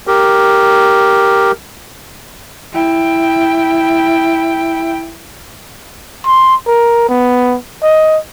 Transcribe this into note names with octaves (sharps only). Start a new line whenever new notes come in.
G4 A#4
E4 G5
C6
A#4
B3
D#5